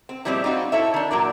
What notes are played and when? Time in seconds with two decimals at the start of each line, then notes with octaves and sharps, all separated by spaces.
0.09 C4
0.25 A#2 F3 G3 G#3 C4 E4
0.44 C4 D#4 F4 F#4
0.72 E4 A4 C#5 E5
0.94 D#3 D4
1.11 A#2 F#3 A#4 D5